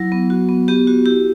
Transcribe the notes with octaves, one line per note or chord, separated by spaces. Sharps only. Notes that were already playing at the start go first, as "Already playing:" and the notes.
Already playing: F#3 E4
B3
F#4
B3
B3 G4
F#4
E4 G4